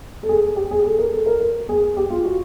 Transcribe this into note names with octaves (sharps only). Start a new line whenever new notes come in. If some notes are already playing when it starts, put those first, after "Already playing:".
A4
G#4
G4
G#4
A4
A#4
A4
A#4
A#4
G#4
G4
F4
F#4